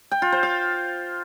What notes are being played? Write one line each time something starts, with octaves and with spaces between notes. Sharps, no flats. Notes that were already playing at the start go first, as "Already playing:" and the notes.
G5
F4
C5
F5